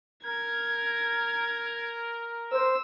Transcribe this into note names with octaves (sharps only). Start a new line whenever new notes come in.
A#4 G#6
C5 E6